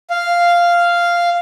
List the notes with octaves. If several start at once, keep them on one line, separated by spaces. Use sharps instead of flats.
F5